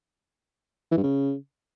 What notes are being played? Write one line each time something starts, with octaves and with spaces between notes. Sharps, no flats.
E3
G2
C#3